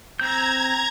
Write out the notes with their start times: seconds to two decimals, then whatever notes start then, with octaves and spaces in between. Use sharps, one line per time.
0.20 C4 A#5 G6 G#6